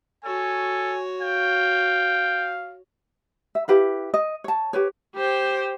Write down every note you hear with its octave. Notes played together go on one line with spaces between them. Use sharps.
F#4 A4 C#5 G#5
F5 G5
E5
E4 G4 B4 F5
D#5
C#5 A5
G4 B4 C#5
G4 C5